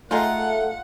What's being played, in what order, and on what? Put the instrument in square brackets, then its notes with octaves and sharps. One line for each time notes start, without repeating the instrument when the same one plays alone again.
[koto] G#3 D#4 G#4 [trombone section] A3 [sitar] F4 [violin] F#5